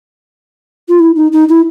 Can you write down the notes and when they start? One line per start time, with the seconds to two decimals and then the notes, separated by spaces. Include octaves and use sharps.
0.88 F4
0.99 E4
1.15 D#4
1.32 D#4
1.49 E4